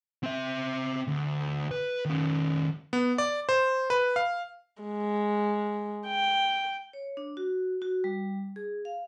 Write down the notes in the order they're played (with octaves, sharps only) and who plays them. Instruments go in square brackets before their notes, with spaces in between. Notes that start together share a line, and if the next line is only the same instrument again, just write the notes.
[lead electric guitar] C4 E5
D2
B4
D#3 C#4
[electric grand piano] B3
D5
C5
B4
F5
[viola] G#3
G5
[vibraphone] C#5
D4
F#4
F#4
G3
G#4
F5